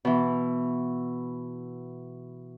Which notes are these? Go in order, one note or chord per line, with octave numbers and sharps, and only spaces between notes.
B2 E3